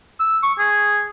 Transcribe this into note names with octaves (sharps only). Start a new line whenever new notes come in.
E6
C#6
G#4